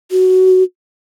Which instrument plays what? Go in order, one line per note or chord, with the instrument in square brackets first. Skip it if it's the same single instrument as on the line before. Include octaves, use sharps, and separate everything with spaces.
[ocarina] F#4